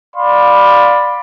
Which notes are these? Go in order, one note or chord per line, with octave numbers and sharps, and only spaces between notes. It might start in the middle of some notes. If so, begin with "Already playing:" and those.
D5 F5 B5 C6